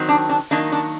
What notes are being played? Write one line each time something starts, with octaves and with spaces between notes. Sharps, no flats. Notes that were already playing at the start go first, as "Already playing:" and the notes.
Already playing: D#3 F#3 C4
D4
D4
D#3 F#3 A#3 D4
D4